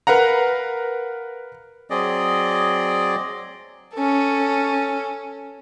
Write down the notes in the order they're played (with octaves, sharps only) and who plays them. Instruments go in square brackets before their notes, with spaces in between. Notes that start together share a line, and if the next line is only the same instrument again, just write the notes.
[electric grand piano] A#4 B4 F5 F#5 A#5
[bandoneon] F#3 C4 G#4 D5 D#5
[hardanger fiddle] C#4 A4